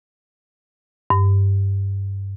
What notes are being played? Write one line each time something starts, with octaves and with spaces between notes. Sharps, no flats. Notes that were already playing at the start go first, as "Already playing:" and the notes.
G2